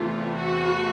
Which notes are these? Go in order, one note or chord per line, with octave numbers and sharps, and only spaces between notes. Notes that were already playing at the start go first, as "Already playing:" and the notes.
Already playing: E2 C3 E3 A3 F4
F#4